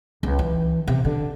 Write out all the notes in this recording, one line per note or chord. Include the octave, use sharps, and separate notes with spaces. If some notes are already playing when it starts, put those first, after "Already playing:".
C#2
E3
C3
D3